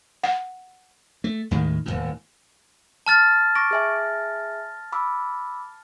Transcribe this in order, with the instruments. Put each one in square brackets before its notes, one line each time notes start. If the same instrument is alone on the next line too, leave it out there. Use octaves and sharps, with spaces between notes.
[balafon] F#5
[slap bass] A3
D#2 A2 D#3 G#3
D#1 G#1 A2
[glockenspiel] A5 F6 A6
[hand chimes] C#6 D6 D7 [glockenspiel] A#6
[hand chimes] G#4 E5 G#5
B5 D6 E6